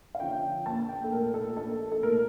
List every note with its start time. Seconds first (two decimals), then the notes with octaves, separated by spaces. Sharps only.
0.15 F5
0.20 D3 F3 C#4 G5
0.66 A#1 A5
0.89 G5
1.04 A4
1.12 A#2 A3 A#4
1.34 A4
1.57 A#1 A4
1.92 A4
2.03 A#2 A3 A#4